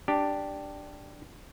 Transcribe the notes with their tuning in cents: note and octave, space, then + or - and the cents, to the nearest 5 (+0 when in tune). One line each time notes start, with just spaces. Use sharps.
D4 +0 G4 +0